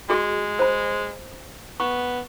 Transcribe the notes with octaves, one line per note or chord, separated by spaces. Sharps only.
G#3 F#4 G#4
C5 B5
B3 C#6